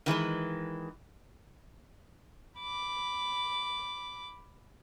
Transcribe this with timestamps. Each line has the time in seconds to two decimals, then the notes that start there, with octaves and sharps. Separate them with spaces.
0.06 D#3 E3 G#3 B4
2.59 B5 D6